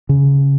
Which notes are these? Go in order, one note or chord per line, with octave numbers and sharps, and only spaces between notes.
C#3